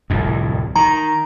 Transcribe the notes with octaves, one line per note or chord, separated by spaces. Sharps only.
D1 C2 F2
D#3 A#5